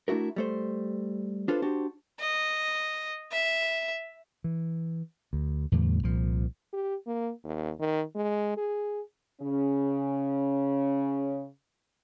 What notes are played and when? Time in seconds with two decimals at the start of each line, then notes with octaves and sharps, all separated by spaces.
0.08 A3 D4 E4 F#4 A#4
0.36 G3 A3 C5
1.48 D4 F4 A4 B4 C5
1.62 D4 F#4 G4 C5
2.20 D#5
3.32 E5
4.44 E3
5.33 D2
5.72 E2 A2 D3 G3
6.03 C2 A#2 F3
6.73 G4
7.06 A#3
7.44 D#2
7.80 D#3
8.16 G#3
8.57 G#4
9.42 C#3 C#4